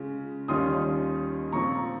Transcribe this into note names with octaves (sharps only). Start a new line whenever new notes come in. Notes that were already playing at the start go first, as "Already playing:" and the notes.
Already playing: C#3 G#3 C#4 F4
D#2 D#3 G3 C#4 F4 C6 D#6
A#2 F3 C4 A#5 C#6